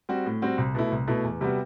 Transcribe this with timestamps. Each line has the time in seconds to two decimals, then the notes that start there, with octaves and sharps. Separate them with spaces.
0.09 G3 C4 F#4
0.26 A2
0.42 G3 C4 F#4
0.58 C2
0.75 B2 A3 E4
0.92 C2
1.08 B2 A3 E4
1.24 E2
1.41 C3 G3 B3 F#4